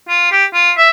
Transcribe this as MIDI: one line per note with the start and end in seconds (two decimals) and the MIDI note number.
0.09 0.30 65
0.31 0.45 67
0.54 0.71 65
0.77 0.90 76